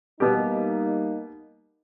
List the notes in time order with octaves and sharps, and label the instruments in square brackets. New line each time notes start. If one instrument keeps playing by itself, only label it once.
[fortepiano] B2 B3 G4 [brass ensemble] G3 A#3 D#4